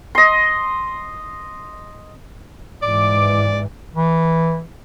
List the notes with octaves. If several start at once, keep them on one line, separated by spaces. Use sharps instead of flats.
D#5 C6
G#2 E3 D5 D6
E3